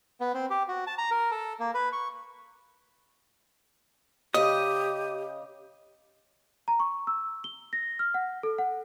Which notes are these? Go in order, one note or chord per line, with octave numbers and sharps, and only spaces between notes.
B3
C4
G4
F#4
A5
A#5
A#4
A4
A#3
B4
C#6
C#3 G4 D#5 D#6
A#5
C#6
E6
G7
A#6
F6
F#5
A4
F#5